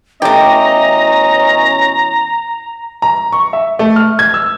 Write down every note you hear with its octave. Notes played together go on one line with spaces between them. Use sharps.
B2 E3 A3 C#4 G4 D#5 A#5
A#5
C#6
E5
A3
F6
G#6
E6